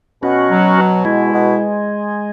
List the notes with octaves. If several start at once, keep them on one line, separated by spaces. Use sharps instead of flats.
B2 C#4 F#4
F#3
B2
G#3 E4
B2